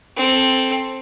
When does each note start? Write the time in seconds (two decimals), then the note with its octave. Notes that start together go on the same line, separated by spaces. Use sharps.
0.16 C4 A4